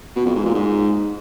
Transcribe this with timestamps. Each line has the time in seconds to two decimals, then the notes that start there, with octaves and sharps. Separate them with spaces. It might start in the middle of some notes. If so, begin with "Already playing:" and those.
0.16 B2
0.26 F2
0.35 G#2
0.45 A#2
0.55 G#2